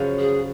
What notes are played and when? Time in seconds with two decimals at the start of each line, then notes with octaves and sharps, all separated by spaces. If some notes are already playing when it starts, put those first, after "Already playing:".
Already playing: F#2 C#3 F3
0.18 G#4